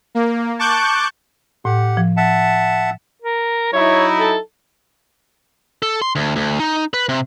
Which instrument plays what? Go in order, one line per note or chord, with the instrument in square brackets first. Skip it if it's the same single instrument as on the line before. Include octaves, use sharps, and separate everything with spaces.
[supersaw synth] A#3
A5 C#6 D6 F#6 G6
[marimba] A2 [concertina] G4 F#5
[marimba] F3
[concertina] E5 F#5 A5
[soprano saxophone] A#4
[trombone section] F#3 D#4 E4 [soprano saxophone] C#5
[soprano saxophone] A4
[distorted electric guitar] A4
C6
D2
D2
D#4
B4
C3